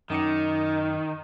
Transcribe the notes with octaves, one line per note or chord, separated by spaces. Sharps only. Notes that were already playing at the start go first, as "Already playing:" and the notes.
F#2 D#3 D#4 D6 C#7